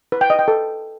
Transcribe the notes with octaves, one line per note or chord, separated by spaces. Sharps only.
B4
G5
D#5
G5
A4